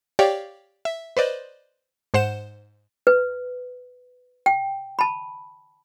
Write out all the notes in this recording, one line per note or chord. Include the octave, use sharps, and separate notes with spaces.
G4 C#5 D5 F5 G5
E5
B4 C5 D5 D#5
G#2 C5 F#5 E7
B4
G5
A5 B5